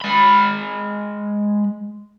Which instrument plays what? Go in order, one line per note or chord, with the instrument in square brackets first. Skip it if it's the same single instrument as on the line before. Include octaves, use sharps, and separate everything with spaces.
[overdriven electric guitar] G#3 B5